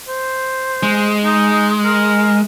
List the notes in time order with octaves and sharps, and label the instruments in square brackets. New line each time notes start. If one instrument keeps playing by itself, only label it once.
[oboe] C5
[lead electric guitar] G#3
[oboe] D#4
A#4